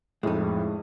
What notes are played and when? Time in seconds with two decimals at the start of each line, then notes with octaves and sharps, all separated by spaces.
0.23 F2 A2 G#3 D#4